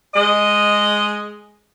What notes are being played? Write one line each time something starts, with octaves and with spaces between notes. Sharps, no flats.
G#3 D#5